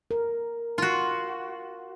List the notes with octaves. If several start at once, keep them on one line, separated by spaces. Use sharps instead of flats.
A#4
F4 F#4